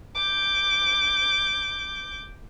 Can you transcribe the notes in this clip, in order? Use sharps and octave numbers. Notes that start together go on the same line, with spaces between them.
D6 G6